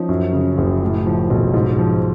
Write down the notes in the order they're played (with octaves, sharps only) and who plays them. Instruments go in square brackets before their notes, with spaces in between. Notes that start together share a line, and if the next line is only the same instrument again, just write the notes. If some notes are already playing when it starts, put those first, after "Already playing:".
Already playing: [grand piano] F3 C#4 D#4
F#2
C#3
F#1
A2
F3
B1
G#2
F3